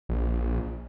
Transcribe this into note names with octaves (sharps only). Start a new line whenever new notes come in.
A#1